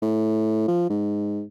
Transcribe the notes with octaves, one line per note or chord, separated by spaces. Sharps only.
A2
F3
G#2